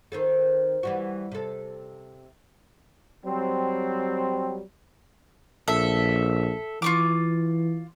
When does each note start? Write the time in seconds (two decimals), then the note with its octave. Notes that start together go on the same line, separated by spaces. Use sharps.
0.12 D#3 C4 A4
0.83 E3 G3 F#4
1.32 C3 A4
3.25 F#3 G3 C4
5.68 A#1 A4 E5
6.82 E3 F4 C#6 D6